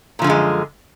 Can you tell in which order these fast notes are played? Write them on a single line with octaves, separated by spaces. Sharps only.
A#2 F3 D3 F#2 G#3